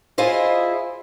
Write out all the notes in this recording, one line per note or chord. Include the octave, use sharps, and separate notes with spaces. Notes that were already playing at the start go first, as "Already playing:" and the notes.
E4 F4 G#4 C5 D#5